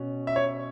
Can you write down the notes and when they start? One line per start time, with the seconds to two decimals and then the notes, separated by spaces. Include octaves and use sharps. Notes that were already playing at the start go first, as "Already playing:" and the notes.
Already playing: B2 C#4
0.27 E5
0.36 C#5